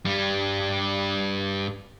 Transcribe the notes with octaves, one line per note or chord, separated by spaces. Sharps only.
G2 G3